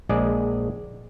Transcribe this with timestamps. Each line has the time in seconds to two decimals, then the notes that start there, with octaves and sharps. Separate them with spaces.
0.09 A#1 G#3 G#4 D5